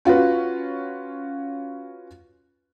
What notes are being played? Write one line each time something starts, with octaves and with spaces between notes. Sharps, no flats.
C#4 F4 F#4 B4